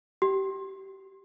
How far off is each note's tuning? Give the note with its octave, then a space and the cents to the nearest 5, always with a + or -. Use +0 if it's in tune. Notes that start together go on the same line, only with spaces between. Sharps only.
G4 -20